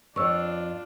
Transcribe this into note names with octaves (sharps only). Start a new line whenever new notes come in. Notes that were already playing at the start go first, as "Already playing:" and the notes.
F2 D4 F4 C#5 C#6 E6